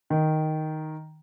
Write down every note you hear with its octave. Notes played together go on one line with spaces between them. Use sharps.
D#3